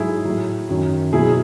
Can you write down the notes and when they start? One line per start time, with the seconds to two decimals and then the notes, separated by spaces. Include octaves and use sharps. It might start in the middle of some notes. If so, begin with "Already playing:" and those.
Already playing: G#2 F#3 E4 G#4
0.25 A2 F#3
0.69 F#2 D#3 F#3
1.13 B2 F#3 E4 G#4